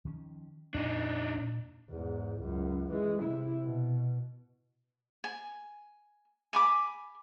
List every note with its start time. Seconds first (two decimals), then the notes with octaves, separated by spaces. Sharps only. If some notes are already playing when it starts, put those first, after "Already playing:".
0.05 D#3 F3 C#4
0.74 F2 A#2 D4 D#4
1.37 A#2
1.89 E2 G#2
2.41 C#2 F#2
2.92 E3 G#3
3.22 C3 E4
3.63 B2
5.24 G#5
6.53 G#5 B5 D6